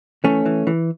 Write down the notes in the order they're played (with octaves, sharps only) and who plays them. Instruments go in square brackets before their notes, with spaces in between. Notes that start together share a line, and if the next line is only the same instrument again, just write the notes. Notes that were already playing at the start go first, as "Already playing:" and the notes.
[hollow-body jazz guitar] E3 A3 C#4
E3
E3